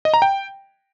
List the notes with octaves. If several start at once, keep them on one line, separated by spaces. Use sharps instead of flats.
D#5
A#5
G5